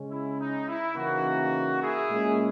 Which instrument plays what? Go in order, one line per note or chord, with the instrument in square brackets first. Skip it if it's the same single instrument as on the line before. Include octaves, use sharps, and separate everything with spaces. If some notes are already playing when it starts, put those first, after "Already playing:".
Already playing: [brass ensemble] C#3 G#3 C#4
E4
D#4
E4
C#3 E3 A#3 C#4 D#4 F#4
E4 G#4
A#2 G#3 C#4